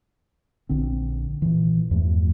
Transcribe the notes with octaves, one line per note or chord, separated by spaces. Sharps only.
A#1 D3 C4
A#2 E3
E2 G2 F3 A3